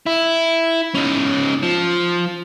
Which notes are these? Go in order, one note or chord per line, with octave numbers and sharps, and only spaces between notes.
E4
C#4 D#4
F3